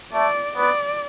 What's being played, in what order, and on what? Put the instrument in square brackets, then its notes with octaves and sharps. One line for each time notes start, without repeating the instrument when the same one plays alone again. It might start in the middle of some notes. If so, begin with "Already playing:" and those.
[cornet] A3 [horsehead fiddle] D5
[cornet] B3 [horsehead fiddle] D5